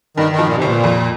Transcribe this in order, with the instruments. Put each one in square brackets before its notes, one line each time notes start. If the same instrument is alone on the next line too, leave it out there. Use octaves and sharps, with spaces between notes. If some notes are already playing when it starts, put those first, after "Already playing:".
[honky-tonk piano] G2 [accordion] D#3
[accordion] D#3
[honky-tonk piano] F3
[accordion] A#2
C3
[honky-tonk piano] G1 [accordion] A#2
[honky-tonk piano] F2